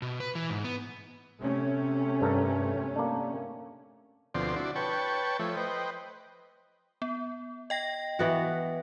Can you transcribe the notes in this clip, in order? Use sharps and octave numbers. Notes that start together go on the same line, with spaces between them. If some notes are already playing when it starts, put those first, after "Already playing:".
B2
B4
E3
G#2
B3
C3 A3 C#4
G2 A4 A#4
A#3 D4
D2 B2 F3 C4 D5 C6
D4 E4 F#4 D5
B4 C#5 G5 A5 C#6
F3 A3 C#5 E5
B4 C5 D#5 G5
B3
D#5 G5 A#6
E3 B3 F#4